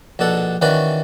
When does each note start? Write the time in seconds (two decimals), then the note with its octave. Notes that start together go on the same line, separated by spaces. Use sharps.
0.19 A#1 B2 D4 A4 F#5
0.61 D#3 E3 C#4 F#4 B4 D5